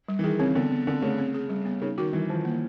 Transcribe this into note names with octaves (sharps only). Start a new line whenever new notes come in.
G3
E3
D#3 G#4
C#3 C4
D3 B3
B3
D3 C4
C#3 A3
C4
G#4
G3
B3
C#3 D#4
D#3 F#4
E3 G3
D#3 F3
A#3